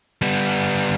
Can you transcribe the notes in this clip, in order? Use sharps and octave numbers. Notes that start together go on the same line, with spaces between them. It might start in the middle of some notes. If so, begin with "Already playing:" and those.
G3 B3